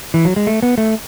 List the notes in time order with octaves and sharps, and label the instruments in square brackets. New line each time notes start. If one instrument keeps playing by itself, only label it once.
[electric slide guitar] E3
F#3
G#3
A3
B3
A3